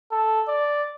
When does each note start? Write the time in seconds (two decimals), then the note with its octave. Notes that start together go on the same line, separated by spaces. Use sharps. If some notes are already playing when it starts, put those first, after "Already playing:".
0.12 A4
0.48 D5